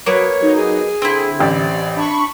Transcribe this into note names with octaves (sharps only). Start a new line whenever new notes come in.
F#3 A#3 B3 C#5
F#3 D#4
G#4
D3 C4 E4
A1 G4 D5
D4 B5 C#6